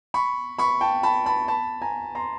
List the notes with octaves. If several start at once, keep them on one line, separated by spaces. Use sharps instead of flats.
B5 C#6
B5 C#6
G5 A5
A5 B5
A5 B5
A5 B5
G#5 A#5
A#5 C6